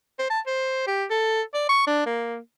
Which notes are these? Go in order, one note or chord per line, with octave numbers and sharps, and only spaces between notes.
C5
A5
C5
G4
A4
D5
C#6
D4
A#3